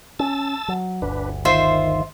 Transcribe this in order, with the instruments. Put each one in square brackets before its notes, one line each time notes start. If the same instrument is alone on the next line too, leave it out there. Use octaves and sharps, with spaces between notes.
[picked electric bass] C#4 [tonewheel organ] A5 E6
[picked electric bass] F#3
[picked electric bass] G1 D2 [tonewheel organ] D4 B4
[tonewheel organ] D#3 [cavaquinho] F4 C5 E5